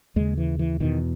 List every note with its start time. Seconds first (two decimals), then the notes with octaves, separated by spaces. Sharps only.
0.16 D#2 C#3 G#3
0.38 E3
0.59 E3
0.80 E2 B2 D#3